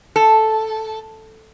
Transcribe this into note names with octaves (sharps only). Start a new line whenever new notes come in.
A4